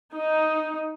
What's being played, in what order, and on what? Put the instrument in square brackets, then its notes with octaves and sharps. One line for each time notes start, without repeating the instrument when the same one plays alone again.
[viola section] D#4